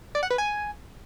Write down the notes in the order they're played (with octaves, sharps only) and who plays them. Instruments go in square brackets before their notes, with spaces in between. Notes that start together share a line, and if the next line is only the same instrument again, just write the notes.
[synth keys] D5
F#5
B4
G#5